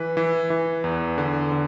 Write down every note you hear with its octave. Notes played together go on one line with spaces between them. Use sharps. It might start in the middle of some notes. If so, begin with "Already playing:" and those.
Already playing: E3 B4
E3
E3
E2
D3
D3